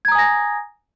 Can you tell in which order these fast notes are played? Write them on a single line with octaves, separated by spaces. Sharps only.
G#6 A#5 D#6 G#5 A#6